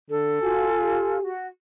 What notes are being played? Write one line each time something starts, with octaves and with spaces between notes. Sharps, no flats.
D3 A4
F4 F#4 G#5
G4
F#4